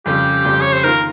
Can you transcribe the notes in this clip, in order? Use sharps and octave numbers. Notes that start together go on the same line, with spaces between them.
F2 C#3 G3 G4
F2 C#3 G3
C#5
C5
D#3 A#3 F4 A#4